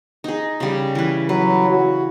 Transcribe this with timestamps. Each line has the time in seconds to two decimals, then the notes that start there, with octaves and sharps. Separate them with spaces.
0.24 D#4 G#4
0.60 C#3 G3
0.95 E3 B4
1.29 F#3 B4
1.70 F#4